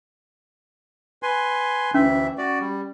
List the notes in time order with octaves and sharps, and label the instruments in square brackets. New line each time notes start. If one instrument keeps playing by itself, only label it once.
[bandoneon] B4 G#5 C6
[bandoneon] D2 E3 E5 [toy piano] C#4
[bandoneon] F#4 D5
G3